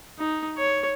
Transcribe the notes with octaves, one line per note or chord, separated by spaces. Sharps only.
D#4
C#5